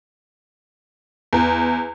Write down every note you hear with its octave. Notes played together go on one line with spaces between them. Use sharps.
E2